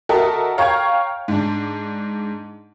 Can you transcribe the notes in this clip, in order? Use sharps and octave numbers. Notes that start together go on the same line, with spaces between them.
F#4 A4 A#4 D#5 E5
C#5 F5 G5 A#5 C#6 G#6
G#2 D4